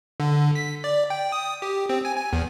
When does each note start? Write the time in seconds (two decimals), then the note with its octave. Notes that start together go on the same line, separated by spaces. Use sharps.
0.20 D3
0.55 B6
0.84 D5
1.10 G5
1.32 D#6
1.62 G4
1.89 C4
2.05 G#5
2.17 G#5
2.33 E2